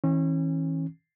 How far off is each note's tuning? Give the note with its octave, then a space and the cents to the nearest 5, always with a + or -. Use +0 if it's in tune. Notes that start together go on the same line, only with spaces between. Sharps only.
E3 -35 C#4 -35